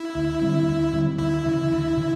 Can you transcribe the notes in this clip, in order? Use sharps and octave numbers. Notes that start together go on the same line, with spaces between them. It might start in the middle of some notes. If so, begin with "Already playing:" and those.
Already playing: E4
D2
D3 G3 C4
D2
D3 G3 C4
D2 E4
C#3 E3
D2
C#3 E3